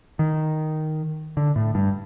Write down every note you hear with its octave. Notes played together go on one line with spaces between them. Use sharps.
D#3
D3
A2
G2